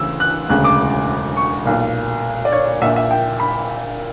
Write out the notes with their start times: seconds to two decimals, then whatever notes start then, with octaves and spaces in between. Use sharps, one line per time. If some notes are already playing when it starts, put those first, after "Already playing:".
Already playing: D2 C#3 E3 E6
0.20 F#6
0.49 E1 D2 C#3 F#6
0.64 D6
1.37 C#6
1.65 B1 A#2
2.45 D5
2.52 C#5
2.81 A#2 E5
2.85 A#1
2.96 E5
3.11 G5
3.40 B5